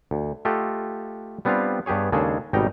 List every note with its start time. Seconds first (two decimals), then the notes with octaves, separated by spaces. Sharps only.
0.11 D2
0.45 A3 F4 G4 A4 D#5 F#5
1.45 G3 B3 C4 D4 F4 F5
1.86 G2 B3 G4 G#4 C#5
2.12 D#2 C#3 G#3 D4 G#4 A4
2.53 G#1 B2 G3 D#4 G5 A#5